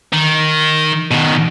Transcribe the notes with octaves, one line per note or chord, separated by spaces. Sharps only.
D#3
B2 D#3